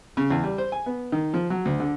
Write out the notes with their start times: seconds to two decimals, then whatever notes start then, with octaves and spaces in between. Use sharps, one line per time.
0.17 C#3
0.31 E2
0.43 G3
0.58 C5
0.72 G#5
0.86 B3
1.12 D#3
1.34 F3
1.50 F#3
1.65 D2
1.80 D3